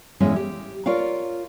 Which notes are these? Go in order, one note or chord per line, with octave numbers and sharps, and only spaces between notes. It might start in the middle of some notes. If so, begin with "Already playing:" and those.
E2 A2 G#3 C#4 E5 F5
G4
F4 A#4 C#5 D5 F5